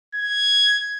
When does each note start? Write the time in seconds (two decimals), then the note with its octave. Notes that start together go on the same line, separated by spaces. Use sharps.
0.15 G#6